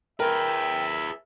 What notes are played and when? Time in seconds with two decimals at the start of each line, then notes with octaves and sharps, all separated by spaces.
0.20 G#4 A#4 B4 E5 G5